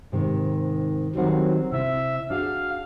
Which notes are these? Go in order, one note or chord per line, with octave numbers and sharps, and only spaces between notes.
G#2 C3 D#3
D#3 F#3 G3 C4 F#5
C3 E4 E5
D4 F#4 G#4 F5